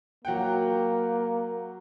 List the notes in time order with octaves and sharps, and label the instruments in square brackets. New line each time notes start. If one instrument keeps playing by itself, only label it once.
[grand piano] F#3 F#5 G5 [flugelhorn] A#3